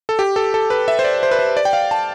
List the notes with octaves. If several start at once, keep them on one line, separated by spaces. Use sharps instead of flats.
A4
G4
A4
A4
B4
E5
C5
D5
C5
B4
C5
D5
G5
F5
A5